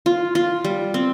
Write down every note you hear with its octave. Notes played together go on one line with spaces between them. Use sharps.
F4
F4
G3
C4